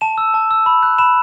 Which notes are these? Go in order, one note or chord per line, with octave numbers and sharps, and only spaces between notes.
A5 E7
E6
A5
E6
B5
F#6
B5 E7